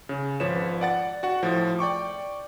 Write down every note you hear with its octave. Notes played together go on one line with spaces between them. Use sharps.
C#3
G#1 F3 B4 C#5 E7
D5 F#5 A6
F#4 F#5
A2 F3
D5 G5 C#6 D6